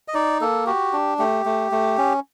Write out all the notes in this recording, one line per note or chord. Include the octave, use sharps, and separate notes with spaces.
D#5
D#4 D5
A#3 A4
F#4 G4
D4
A3 G4
A3
A3
C#4